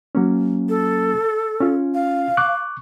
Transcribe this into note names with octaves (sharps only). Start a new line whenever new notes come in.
F#3 A#3 C#4
A4
C#4 F4
F5
C#6 D6 F#6